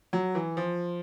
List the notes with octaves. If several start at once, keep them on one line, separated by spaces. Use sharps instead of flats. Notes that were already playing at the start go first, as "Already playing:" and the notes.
F#3
E3
F3